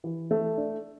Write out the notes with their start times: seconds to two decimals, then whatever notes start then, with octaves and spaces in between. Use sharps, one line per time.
0.04 E3
0.31 A3
0.57 D4